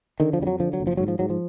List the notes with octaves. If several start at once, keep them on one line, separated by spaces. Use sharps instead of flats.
D3 D#3
F3
F2 G3
F#3
D3 F3
F#3
F#1
F3
G#2 F#3
F3
G#2 F#3
F3